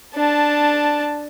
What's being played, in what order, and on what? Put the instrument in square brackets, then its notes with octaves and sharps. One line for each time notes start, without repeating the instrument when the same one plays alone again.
[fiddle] D4 A5